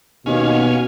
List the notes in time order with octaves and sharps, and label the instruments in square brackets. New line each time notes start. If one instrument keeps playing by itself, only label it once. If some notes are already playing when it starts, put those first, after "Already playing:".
[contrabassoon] D#2 [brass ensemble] B2 [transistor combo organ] C#4 F5 G#5